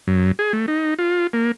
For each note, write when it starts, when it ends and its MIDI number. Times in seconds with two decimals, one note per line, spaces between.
0.07 0.32 42
0.39 0.53 68
0.53 0.66 57
0.68 0.94 63
0.99 1.27 65
1.33 1.52 58